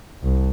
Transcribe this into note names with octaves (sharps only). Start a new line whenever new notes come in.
C2